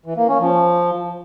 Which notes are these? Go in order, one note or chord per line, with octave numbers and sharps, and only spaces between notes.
E3
A#3
C#4
F3